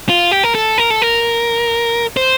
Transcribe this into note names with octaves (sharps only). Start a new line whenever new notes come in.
F4
G4
A#4
A4
A#4
A4
A#4
C5